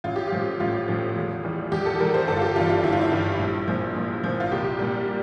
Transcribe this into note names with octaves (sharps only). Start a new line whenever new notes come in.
A1 F4
G4
F4
A2 F3
A1 F4
A2 F3
E2
E3 G3
E2 G4
A4
E3 G3 A#4
C5
G1 A4
F4
G4
G2 E3 G3 F4
F4
G1 E4
F4
E4
G2 E3 G3
A#1
A#2 F3
A#1
A#2 F3
F4
C2 G4
A#2 G3